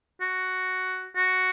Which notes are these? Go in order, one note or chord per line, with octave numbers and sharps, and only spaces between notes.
F#4
F#4